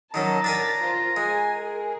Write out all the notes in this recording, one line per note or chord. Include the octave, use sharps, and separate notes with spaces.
D#3 F#3 C#4 A5 A#5
D4 A#4 G#5 A6 B6
F4 C5
G#3 G#5
G#4 A#4